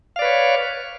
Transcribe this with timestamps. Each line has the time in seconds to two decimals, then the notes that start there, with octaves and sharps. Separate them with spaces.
0.16 F5
0.19 D5
0.22 B4
0.25 C#5